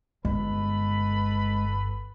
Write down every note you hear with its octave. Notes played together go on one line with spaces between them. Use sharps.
G1 G#3 A4 B4 B5